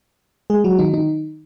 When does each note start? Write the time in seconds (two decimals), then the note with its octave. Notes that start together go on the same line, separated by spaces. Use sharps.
0.50 G#3 G#4
0.64 F#3 F#4
0.79 D#3 D#4
0.94 D#3 D#4